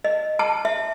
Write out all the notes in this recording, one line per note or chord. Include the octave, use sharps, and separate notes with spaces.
D#5
A5
E5